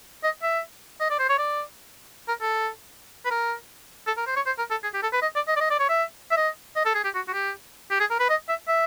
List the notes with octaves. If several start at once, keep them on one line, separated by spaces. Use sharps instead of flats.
D#5
E5
D#5
D5
C5
C#5
D5
A#4
A4
B4
A#4
A4
A#4
C5
C#5
C5
A#4
A4
G#4
G4
A4
B4
D#5
D5
D#5
D5
D#5
D5
C#5
E5
E5
D#5
D#5
A4
G#4
G4
F#4
F#4
G4
G4
G#4
A#4
B4
D#5
E5
E5